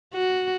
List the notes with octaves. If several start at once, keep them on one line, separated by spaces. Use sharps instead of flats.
F#4